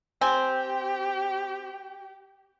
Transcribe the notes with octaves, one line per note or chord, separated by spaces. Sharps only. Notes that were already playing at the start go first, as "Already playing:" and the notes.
C4 G4 G5 G#5